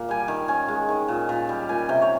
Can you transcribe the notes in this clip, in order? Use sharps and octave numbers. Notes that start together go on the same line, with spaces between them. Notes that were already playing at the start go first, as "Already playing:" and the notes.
Already playing: A#2 A#3
G3 G#5
D#3
C#4 G#5
G#3
D#3
A#2
A#2
G3
A#2 G#5
C3 G5
C#5